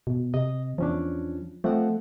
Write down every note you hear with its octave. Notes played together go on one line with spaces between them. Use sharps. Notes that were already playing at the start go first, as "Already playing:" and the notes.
B2
C3 D#5
E2 F3 C#4 D4
F3 A3 C4 F#5